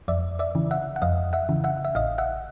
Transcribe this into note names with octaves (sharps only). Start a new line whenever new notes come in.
F2 D5 E5
D5 E5
C#3 E3
E5 F#5
F#5
F2 D#5 F5
E5 F#5
C#3 E3
E5 F#5
E5
A1 D#5 F5
E5 F#5